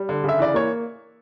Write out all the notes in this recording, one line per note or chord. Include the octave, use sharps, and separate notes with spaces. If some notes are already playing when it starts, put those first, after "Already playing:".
Already playing: G3
D3
C#3 E5
E3 D5
A#3 C#5